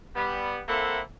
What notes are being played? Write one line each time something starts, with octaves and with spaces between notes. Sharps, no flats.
G3 B3
A#3 C4 E4 A4 E5 F#5